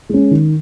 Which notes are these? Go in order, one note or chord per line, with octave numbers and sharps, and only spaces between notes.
G#3 C#4
D#3